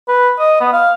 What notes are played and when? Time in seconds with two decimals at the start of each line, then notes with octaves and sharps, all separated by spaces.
0.08 B4
0.39 D#5
0.61 B3
0.73 F5